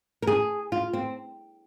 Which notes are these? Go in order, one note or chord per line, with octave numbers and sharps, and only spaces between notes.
A#4
G#4
F4
C4